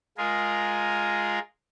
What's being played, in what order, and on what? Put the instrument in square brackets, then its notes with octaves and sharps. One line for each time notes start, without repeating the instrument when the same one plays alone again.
[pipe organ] G#3 F4 G#4 A#4